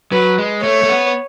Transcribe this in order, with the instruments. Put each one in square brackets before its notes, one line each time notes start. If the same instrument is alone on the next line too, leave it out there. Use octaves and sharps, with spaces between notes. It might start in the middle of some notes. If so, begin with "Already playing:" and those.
[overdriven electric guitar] F#3 [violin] B4
[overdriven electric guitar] G#3
[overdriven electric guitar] A3 [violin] C#5
[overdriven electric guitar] A3
B3